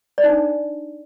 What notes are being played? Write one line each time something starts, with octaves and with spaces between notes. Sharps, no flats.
D5
D#4
D4